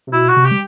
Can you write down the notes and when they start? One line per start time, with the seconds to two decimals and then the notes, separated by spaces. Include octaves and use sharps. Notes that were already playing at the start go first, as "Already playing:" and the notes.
0.07 C3
0.13 B2 E4
0.28 F#4
0.36 C3
0.45 G4
0.51 G3